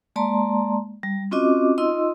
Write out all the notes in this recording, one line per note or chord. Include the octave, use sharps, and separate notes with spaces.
G#3 A#3 D5 A5 A#5 C6
G3
C4 C#4 F4 F#4 D#5 D6
D#4 F4 D#5 C6 E6